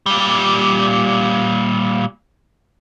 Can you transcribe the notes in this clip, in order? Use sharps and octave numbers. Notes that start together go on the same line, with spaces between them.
A#2 G3